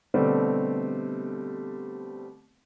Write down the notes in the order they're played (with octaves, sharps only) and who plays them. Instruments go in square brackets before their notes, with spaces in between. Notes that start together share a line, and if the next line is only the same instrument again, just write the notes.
[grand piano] B2 D3 G3 A3 C4